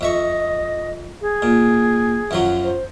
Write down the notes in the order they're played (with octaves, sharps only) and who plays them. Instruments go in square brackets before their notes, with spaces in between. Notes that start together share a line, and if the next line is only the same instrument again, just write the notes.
[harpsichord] F2 E5 C#6 [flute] D#5
[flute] G#4
[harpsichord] A#2
F#2 F3 F#3
[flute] C5